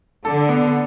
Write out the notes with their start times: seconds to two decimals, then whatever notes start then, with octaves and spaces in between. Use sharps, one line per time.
0.25 D3 A4
0.49 B3